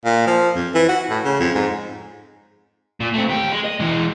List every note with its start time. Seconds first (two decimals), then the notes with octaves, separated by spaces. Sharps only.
0.05 A#2
0.27 F3
0.55 F2
0.74 E3
0.89 F#4
1.10 A2
1.24 C#3
1.40 F2
1.55 G#2
3.00 A#2
3.14 A3 C4
3.29 D#2 G4
3.52 G#3
3.64 D#5
3.80 E3 G#3